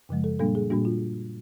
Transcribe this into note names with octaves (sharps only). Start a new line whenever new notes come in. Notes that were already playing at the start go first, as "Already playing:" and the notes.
F#2 C#3 F3 G#3
A4
A#2 G3 A#3 D4 A4
G#4
A#2 G3 A#3 D4 F#4
F4